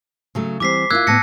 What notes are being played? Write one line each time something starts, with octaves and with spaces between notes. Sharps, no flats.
C#3 F#3 A3
E3 G3 C4 D6 B6 C7
A#3 E4 F4 E6 F#6 G#6
A2 B3 A5 A#6 C#7